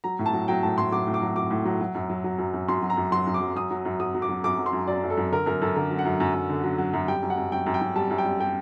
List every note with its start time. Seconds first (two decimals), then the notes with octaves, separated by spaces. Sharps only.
0.04 F#3 A#5
0.19 A2
0.26 A5
0.34 F#3
0.48 F#3 G5
0.63 A2 A5
0.78 A2 C6
0.92 F#3 D6
1.07 A2
1.14 D6
1.21 F#3
1.36 F#3 D6
1.51 A2
1.65 F#3
1.81 F#3
1.95 F#2
2.10 F#3
2.24 F#3
2.38 F#2
2.54 F#2
2.68 F#2 C6
2.83 F#3
2.90 A#5
2.97 F#2
3.12 F#3 C6
3.27 F#2
3.34 D6
3.41 F#3
3.55 F#2 D#6
3.71 F#3
3.85 F#2
4.00 F#3 D#6
4.15 F#3
4.22 D6
4.29 F#3
4.44 F#2 D6
4.59 F#3
4.66 C6
4.73 F#2
4.87 F#3 D5
5.03 F#2
5.10 A4
5.17 F#2
5.32 D3 A#4
5.46 F#2 A#4
5.61 F#2 A4
5.76 D3 A#4
5.91 F#3
5.99 F#5
6.05 F#2
6.20 F#2
6.34 F#2
6.49 D3
6.64 F#3
6.78 F#3
6.93 F#2
7.08 G3 G5
7.23 F#2
7.30 F#5
7.37 F#2
7.52 F#2 G5
7.66 F#2
7.74 G5
7.81 F#2
7.96 G3 A5
8.11 F#2
8.18 G5
8.26 G3
8.40 G3 G5